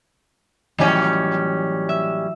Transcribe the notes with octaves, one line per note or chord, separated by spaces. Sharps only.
A2 E3 F#3 G3 C#4
E5